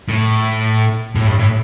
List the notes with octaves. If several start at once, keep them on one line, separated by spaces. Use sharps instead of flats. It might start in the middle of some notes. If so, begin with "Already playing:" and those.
A2
A2
G2
A2